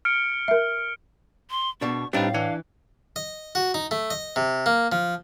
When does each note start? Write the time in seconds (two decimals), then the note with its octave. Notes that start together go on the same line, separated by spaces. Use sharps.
0.05 F6 C#7 D7
0.48 A#4 E5
1.50 C6
1.81 B2 D4 C#6
2.13 A2 G3 C4 D4 D#4 B4 F5
2.34 E3 D4
3.16 D#5
3.55 F#4
3.74 D#4
3.91 A3
4.10 D#5
4.36 C3
4.66 A#3
4.92 F3